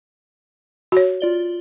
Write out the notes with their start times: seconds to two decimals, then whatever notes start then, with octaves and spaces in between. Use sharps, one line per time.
0.92 F#4 C#5
1.21 F4 D5 G7